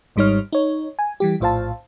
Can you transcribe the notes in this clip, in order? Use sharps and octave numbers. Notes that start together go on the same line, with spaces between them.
G#1 G#2 G3 D#4 C#5 F6
D#4 C#5
G#5
E3 G3 G4
A#1 A2 F4 C5 F5 A5